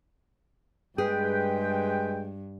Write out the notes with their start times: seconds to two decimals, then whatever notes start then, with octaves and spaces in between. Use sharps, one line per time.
0.98 G2 G#3 G#4 B4 G5